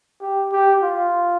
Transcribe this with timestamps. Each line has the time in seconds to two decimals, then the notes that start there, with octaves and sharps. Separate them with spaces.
0.21 G4
0.52 G4
0.82 F4